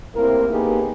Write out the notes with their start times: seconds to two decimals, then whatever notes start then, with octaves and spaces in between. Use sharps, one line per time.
0.16 A2 C3 A#3 C4 E4 A#4
0.50 A#3 B3 D#4 G4 G#4